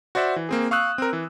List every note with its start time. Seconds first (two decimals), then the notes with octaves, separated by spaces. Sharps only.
0.15 F#4 C5 D5 E5 F#5
0.36 E3
0.49 A#3 C4 G#4
0.71 F5 C#6 D#6 E6 F#6
0.98 C4 A#4
1.13 E3